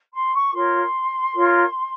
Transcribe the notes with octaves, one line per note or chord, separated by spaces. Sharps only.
C6
C#6
F4 A#4 C#5 C6
F4 A#4 C#5